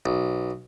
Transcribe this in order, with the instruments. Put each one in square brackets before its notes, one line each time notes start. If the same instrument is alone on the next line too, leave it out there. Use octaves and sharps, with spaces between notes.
[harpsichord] B1